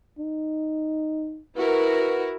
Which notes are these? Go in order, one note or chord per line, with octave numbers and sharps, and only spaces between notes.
D#4
E4 F#4 A#4 B4